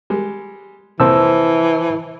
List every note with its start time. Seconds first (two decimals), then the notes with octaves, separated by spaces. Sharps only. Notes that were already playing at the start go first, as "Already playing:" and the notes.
0.10 G3 G#3
1.00 C2 F2 A#2 E3 C5 A5 E6